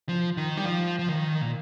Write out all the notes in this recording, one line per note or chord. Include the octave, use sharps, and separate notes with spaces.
F3
D#3
G3
F3
F3
D#3
A#2